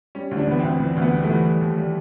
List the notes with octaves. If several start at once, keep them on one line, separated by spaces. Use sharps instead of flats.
G3 C#4
D2
D4
E3 B3
C4
D2
E3
D2
B3
G3
A3
E3
G3
D#2
G3